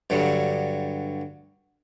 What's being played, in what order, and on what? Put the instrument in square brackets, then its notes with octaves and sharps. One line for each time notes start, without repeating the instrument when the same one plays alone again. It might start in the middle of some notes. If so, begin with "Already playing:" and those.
[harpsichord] G2 D3 F#3 G3